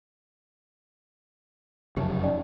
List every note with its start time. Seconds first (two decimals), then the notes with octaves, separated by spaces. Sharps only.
1.97 F1 F#2 C#3 G4 C#5 A5
2.24 C#4 D#4 D5